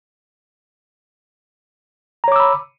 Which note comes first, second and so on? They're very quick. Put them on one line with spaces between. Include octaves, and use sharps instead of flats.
A#5 C#5 D6 E6 B5